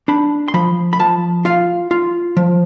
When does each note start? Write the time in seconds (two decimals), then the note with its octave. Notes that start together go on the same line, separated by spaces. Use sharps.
0.08 D4 B5
0.48 C6
0.54 F3 B5
0.93 B5
0.99 F3 A5
1.45 F4 F5
1.91 F4
2.37 F3